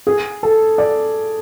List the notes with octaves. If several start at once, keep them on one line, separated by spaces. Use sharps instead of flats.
G#4
A4
D5